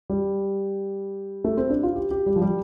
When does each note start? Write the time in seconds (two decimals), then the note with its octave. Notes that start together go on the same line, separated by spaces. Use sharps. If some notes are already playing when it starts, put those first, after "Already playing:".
0.10 G3
1.44 A3
1.57 C4
1.70 D4
1.83 F4
1.95 G4
2.11 G4
2.26 G3
2.36 F3
2.42 G3